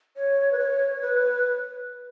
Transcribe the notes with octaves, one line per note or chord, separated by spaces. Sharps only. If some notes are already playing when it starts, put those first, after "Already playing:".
C#5
B4
C#5
B4